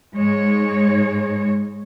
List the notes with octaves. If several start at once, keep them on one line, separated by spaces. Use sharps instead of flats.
G#2 G#3 C#5